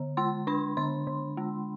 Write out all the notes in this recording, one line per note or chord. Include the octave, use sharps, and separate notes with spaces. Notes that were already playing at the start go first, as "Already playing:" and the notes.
Already playing: D3
G#3 C6
D4 B5
D3 C6
D3
G#3